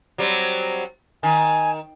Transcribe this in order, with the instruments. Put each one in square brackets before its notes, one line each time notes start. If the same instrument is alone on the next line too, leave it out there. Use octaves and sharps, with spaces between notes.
[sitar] F#3 G3 C4
[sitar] D#3 [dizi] G#5